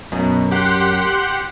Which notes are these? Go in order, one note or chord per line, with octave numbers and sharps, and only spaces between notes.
F#2 B2
G4 F#5 C6